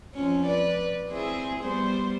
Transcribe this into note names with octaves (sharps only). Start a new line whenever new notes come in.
F2 F3 C#4
B4 D5
C4 E4 G#4
G3 B3 C5